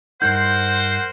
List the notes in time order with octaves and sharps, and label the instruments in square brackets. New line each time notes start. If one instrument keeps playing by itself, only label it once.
[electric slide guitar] G2 G3 D#4 [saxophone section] A#4 F#5 [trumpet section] C5 [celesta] G6